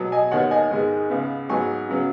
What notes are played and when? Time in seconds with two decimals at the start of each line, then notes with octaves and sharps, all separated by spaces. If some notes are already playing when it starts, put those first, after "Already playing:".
Already playing: B2 F#3 B3
0.12 D#5 G#5
0.31 D#2 D#3 B3 C#5 F#5
0.51 D#5 G#5
0.71 G#2 D#3 G#3 B3
1.10 C#2 C#3 B3
1.49 G#2 F#3 B3 G#5 C#6
1.89 C#3 F#3 B3